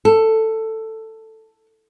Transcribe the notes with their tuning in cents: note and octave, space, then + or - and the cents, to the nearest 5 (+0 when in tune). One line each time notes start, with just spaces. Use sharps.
A4 +10